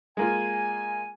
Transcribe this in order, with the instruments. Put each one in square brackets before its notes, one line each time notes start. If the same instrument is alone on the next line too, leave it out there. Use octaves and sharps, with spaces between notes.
[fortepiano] G#3 A#3 F4 [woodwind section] G#5